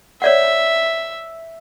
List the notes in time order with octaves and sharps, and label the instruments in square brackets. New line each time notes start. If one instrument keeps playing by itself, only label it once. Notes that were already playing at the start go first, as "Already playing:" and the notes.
[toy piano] C#5 D5 F#5 [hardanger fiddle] E5